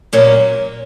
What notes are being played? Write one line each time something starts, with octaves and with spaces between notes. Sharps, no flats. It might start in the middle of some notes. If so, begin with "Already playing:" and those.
A#2 F#3 A#3 C#4